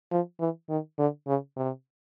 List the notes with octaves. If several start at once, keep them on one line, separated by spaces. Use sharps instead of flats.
F3
E3
D#3
D3
C#3
C3